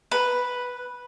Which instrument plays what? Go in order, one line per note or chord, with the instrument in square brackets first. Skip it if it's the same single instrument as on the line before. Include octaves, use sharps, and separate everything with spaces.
[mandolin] B4